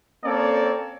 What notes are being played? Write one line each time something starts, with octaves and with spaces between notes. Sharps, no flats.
A#3 C4 C#4 A4 C#5 D5